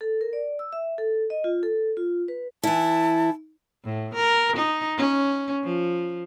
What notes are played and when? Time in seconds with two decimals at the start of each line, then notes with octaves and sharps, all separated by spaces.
0.01 A4
0.21 A#4
0.33 D5
0.59 E6
0.72 E5
0.98 A4
1.30 D#5
1.44 F4
1.63 A4
1.97 F4
2.28 B4
2.63 E3 E4 A5
3.84 A2
4.14 A#4
4.57 D#4
4.97 C#4
5.63 F3